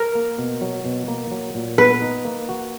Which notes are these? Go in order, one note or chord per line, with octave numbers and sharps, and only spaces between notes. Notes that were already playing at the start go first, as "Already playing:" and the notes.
Already playing: A#4
A#3
B2
F#3
B2
A#3
F#3
A#2
B3 B4
D#4
A#3
F#4